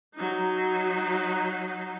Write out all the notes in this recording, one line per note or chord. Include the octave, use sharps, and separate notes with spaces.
F#3 D#4